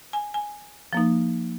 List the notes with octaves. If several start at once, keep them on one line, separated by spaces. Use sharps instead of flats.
G#5
G#5
F3 A#3 D#4